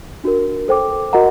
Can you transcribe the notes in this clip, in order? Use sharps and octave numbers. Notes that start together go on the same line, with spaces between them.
D4 F#4 A#4
A4 C5 G5 D6
F#4 A#4 D#5 F#5 A#5